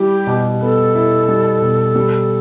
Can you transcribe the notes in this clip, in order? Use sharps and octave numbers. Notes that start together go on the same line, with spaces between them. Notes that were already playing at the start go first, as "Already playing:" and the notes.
Already playing: G3 E4 G4
B2
B3 A4
E4
G3
B2
G3